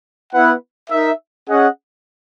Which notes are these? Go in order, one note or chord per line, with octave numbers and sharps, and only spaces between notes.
B3 E4 B4 F#5
D#4 A#4 E5
C#4 G#4 D#5 F#5